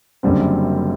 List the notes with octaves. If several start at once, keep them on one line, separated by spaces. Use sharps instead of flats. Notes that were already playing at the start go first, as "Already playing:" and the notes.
F#1 F#2 D3 G3 C4